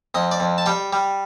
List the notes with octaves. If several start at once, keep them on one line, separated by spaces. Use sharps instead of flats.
F2 D#5
D5
F2
A5
G3 G5
G3